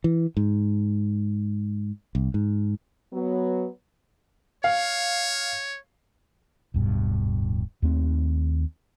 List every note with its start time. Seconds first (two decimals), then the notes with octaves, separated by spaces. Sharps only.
0.04 E3
0.37 G#2
2.15 C2
2.34 G#2
3.13 F#3 B3
4.64 C#5 F5
6.74 D1 G2 B2
7.82 D#2 A3 C4